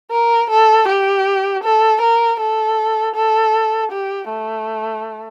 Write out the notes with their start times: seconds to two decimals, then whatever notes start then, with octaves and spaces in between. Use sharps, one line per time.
0.11 A#4
0.50 A4
0.88 G4
1.63 A4
2.01 A#4
2.40 A4
3.15 A4
3.91 G4
4.29 A3